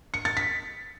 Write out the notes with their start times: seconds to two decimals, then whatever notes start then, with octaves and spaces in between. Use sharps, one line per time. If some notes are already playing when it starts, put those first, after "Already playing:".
0.14 C#7
0.25 A6
0.37 B6